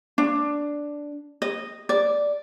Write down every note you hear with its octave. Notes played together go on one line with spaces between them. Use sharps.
D4
D#5
D5